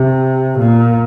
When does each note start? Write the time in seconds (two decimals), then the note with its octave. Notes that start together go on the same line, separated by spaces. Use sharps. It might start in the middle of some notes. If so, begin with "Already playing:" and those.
Already playing: C3
0.59 A#2